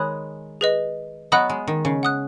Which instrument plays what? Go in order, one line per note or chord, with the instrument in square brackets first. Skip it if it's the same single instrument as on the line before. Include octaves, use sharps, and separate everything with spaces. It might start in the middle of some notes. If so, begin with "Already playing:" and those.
Already playing: [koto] D#3 G#3 [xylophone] C#5 B5 D#6 F#6
[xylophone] G#4 B4 D#5
[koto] F#3 B3 [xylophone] D#5 F#5 B5 D#6 F#6
[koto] G#3
D#3
C#3
[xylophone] F#5 D#6 F#6